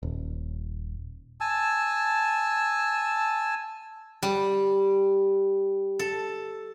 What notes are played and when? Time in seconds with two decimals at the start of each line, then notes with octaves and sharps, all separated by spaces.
0.03 D#1
1.41 G#5 A5 E6
4.23 G3
5.99 A4